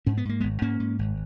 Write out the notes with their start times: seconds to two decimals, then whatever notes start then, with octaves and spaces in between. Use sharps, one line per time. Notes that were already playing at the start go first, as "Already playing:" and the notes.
0.06 G#2 C#4
0.17 B3
0.25 G#2 A#3
0.40 G#1 G#3 B3
0.62 G#2 A#3 C#4
0.80 G#2
0.99 G#1